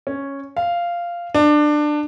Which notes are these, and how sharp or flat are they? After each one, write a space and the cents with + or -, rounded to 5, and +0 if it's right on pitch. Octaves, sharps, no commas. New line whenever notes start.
C#4 -5
F5 -10
D4 +20